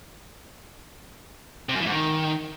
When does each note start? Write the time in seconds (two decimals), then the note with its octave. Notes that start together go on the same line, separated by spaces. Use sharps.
1.69 C3
1.75 F#2
1.80 E3
1.86 G#2
1.92 D#3